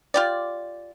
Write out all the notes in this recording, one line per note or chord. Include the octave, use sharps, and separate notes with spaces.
F4 G4 D5